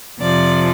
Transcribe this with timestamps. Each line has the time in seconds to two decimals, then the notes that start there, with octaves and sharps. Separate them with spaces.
0.21 F2 C3 F3 D5